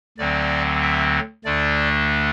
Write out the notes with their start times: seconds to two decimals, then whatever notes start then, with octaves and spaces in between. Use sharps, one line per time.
0.18 D2 D3 F#3 C4 D5
0.81 E5
1.45 D2 D3 A3 D4 D5